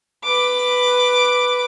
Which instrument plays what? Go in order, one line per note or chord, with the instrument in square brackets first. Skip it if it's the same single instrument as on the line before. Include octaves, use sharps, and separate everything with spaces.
[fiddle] B4 D6